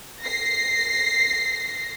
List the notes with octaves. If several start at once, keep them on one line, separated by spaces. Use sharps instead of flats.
A#6 C7